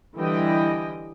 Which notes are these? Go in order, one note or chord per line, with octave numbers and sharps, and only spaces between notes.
D3 E3 G3 E4 D#5 G5